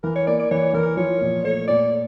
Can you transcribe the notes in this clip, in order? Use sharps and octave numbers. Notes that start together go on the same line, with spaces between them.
E3 A#4
C#5
A#3 D5
D5
E3 C#5
E3 A#4
F3 C#5
A#2
A3 C#5
A#2 D5